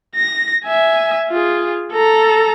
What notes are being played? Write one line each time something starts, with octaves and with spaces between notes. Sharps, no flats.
A#6
E5 G#5
F4 G#4
A4 A#5